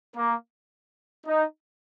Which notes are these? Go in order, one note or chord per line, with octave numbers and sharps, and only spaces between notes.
A#3
D#4